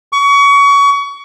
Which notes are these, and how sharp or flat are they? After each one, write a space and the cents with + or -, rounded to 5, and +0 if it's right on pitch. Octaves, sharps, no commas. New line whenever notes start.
C#6 +30